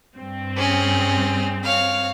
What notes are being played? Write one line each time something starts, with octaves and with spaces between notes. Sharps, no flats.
G2 C4
C#4 G#4
C#5 F5